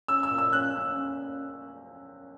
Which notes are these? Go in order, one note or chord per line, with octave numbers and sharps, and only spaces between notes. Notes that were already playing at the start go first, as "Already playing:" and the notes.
C#4 E6
E6
A#2
E6
C#4 F#6
C#4
C#4